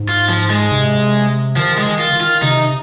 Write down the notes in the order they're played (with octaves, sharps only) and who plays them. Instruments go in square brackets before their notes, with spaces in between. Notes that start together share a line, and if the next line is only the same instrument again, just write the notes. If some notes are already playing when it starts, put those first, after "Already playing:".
Already playing: [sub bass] G#2
[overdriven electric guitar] F4
F3
G#3
[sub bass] C3
[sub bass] D#3 [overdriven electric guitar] F3
[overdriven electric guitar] G#3
[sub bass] D#3
[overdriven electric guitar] F4
[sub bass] D#3
[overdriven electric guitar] F4
[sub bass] C3 [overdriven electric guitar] D#4